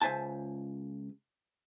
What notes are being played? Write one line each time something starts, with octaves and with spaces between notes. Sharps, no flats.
C#2 C5 E5 G#5 A5